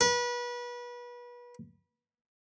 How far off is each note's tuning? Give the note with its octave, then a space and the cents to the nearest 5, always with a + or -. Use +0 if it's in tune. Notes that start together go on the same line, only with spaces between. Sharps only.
B4 -30